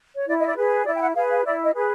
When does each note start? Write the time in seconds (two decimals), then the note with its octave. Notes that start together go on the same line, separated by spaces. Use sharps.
0.15 C#5
0.28 E4 D5
0.39 D#5
0.47 D5
0.56 G#4 B4
0.85 E4 D5
0.96 G5
1.01 F#5
1.15 G#4 B4 F5
1.30 F5
1.44 E4 D5
1.64 D#5
1.73 G#4 B4